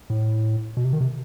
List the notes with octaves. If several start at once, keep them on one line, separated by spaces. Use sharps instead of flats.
A2
B2
C3
D#3
C3